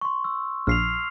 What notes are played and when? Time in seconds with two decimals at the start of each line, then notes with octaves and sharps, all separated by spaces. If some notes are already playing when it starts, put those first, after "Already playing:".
0.01 C6 C#6
0.24 E6
0.67 A#1 F6 C7 F7